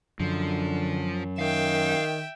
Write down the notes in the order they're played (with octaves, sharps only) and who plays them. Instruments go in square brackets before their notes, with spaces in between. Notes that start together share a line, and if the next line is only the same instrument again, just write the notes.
[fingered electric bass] F#2 [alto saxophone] D3 [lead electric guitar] F3
[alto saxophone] D#3 [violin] E5 G5 [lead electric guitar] F5